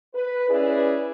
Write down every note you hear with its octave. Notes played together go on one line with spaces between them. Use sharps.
B4
C#4 E4 G#4 B4 D5